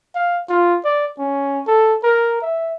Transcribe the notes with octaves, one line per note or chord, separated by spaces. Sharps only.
F5
F4
D5
C#4
A4
A#4
E5